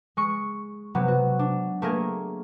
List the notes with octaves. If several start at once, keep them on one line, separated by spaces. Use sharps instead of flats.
G#3 C#6
C3 F#3 B3
F#4
D4
A3 A#3 G#4 A#4